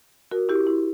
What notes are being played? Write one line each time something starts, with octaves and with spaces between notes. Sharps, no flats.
F#4 A#4
E4 G4
E4